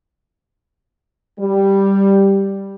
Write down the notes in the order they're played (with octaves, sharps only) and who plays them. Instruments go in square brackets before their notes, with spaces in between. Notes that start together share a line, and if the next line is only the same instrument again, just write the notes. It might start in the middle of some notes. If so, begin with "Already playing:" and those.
[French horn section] G3